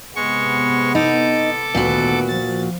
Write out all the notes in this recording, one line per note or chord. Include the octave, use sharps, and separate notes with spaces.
C3 G#3 B3 C#6
D#4 A4 D6
D2 A#2 D#3 B3 F#4
F3 A6